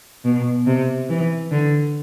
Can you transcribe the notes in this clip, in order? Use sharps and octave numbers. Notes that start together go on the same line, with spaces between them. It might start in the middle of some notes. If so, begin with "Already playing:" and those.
B2
C3
E3
D3